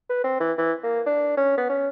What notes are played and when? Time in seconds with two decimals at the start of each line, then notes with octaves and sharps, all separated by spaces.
0.10 B4
0.24 C4
0.40 E3
0.58 E3
0.83 A#3
1.06 D4
1.37 C#4
1.58 B3
1.70 C#4